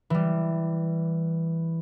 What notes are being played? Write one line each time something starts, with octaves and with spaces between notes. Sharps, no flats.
E3 G3